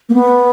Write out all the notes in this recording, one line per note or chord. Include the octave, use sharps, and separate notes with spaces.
A#3
B3